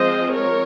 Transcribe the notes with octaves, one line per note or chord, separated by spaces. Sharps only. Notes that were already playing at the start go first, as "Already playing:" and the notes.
Already playing: F3 G#3 C4 C5 D#5
A#4 C#5